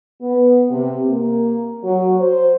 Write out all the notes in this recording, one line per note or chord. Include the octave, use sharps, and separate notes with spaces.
B3
C3
A#3
F#3
C5